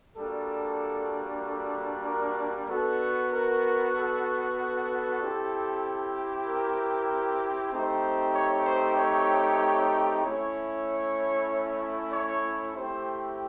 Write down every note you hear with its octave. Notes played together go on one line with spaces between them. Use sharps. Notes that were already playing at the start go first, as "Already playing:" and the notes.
G3 A#3 D4 F#4 A4
A4
A#4
B3 D4 F#4 A4
A#4
A4
A4
C4 E4 G4
A#4
A3 C4 D#4 G4 C5
C#5
C5
C#5
A3 C#4 E4 C#5
C#5
A3 C4 E4 G4 C5